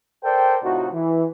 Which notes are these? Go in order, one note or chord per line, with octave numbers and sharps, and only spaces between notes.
A4 A#4 C5 D5 G5
A2 C3 D#4 F4 F#4
E3